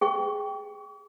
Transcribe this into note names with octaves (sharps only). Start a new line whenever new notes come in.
G#4 G5 C#6